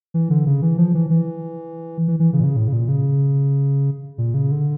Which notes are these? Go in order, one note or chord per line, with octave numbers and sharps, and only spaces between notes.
E3
D3
C#3
E3
F3
E3
E3
E3
E3
C#3
A#2
C#3
A2
C#3
A#2
C#3
A#2
C#3
D3